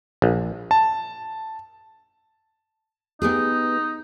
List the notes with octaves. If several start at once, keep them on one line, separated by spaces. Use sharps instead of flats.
A#1
A5
B3 D#4 G4 G#4